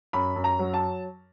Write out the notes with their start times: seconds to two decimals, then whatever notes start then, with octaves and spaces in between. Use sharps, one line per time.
0.13 F#2 B5
0.36 F#2
0.44 A#5
0.59 F#3
0.74 A5